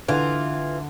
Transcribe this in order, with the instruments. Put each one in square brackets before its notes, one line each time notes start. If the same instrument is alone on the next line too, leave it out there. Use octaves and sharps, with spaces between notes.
[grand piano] D3 [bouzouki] E3 F4